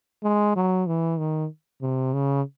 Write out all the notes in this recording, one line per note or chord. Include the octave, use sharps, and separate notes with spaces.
G#3
F#3
E3
D#3
C3
C#3